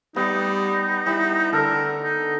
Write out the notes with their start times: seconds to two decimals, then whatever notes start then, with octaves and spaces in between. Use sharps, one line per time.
0.16 G3 B3 D#4
1.07 G3 E4
1.53 D3 A4 A#4
2.04 D#4